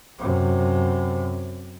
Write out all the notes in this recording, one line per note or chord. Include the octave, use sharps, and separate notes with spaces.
F#2 C3